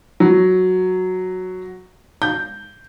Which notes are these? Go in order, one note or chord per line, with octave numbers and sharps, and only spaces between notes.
F#3
G6